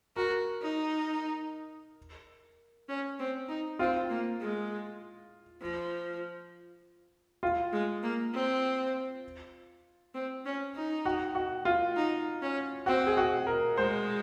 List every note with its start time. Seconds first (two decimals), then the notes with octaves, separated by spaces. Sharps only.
0.16 F#4 A#4
0.62 D#4
2.89 C#4
3.19 C4
3.48 D#4
3.79 C4 F4
4.10 A#3
4.40 G#3
5.61 F3
7.43 F4
7.72 G#3
8.03 A#3
8.33 C4
10.14 C4
10.45 C#4
10.75 D#4
11.05 F#4
11.35 F#4
11.65 F4
11.96 D#4
12.42 C#4
12.86 C4 F#4
13.07 G#4
13.17 F#4
13.47 A#4
13.77 G#3 C5